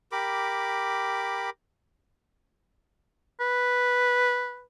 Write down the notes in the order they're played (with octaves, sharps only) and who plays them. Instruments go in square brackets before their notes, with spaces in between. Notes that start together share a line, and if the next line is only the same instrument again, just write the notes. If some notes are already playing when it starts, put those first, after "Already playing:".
[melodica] G4 A#4 B5 D6
[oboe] B4